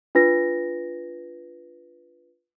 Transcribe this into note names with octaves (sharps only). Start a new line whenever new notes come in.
D4 F4 B4 A#6